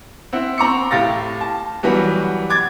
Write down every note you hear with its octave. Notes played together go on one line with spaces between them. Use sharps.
C4 E4 F#5
C4 A#5 C#6 D6 C#7
A2 G4 F5 A6 A#6
A5
E3 F#3 G3 B3 F#4
D6 G#6 A6